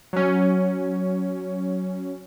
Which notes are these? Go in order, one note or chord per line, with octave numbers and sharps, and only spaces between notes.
F#3 C#4